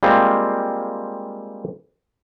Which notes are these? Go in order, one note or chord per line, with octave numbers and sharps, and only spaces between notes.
G3 G#3 A#3 C4 F4